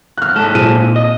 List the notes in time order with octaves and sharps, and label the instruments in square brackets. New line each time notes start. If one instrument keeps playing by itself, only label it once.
[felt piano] F6 F#6
[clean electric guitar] G#2 A4
[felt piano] A#2 C4 D#7
[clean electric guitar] D#5